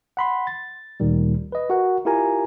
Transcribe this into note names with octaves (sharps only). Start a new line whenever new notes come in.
F#5 B5 C6
A6
D2 A#2 D#3 G3
B4 D#5
F#4 A#4 F#5
E4 F4 G4 A#4 G#5 A#5